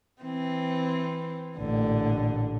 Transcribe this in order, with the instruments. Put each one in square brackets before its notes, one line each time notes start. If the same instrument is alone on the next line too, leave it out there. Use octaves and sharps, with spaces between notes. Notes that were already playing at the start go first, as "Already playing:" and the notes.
[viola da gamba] E3 C4
[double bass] A1 A#2 [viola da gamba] D3